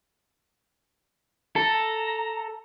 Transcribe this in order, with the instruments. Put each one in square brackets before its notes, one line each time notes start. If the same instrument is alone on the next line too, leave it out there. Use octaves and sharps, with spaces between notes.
[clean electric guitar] A4 [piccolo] A#5